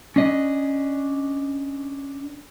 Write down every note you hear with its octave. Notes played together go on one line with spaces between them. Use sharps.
C#4 D4 D#5